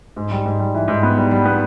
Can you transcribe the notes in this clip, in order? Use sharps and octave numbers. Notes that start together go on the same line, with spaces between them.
G#2
G3
G#2
G3
E3
G#2
B3
G3
G3
B3